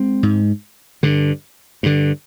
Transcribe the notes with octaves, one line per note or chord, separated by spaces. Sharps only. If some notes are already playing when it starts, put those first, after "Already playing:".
Already playing: G#3 C4
G#2
G2 D3
G2 D3